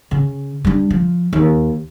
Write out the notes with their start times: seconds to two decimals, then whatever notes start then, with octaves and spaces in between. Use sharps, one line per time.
0.11 C#3
0.64 G3 D4
0.90 F3
1.33 D#2